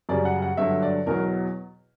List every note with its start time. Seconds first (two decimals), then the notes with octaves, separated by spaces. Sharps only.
0.09 F#2 C#3 G3 D5
0.25 F#5
0.42 F#5
0.57 G2 D3 F#3 E5
0.82 D5
1.06 E2 B2 F#3 A#4